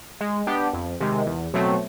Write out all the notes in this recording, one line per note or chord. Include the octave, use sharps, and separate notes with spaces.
G#3
B3 D4 G4
F2
C3 D#3 G#3
E2
B2 F#3 A3 C4